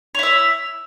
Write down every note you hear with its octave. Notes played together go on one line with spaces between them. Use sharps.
E4 C#5 E5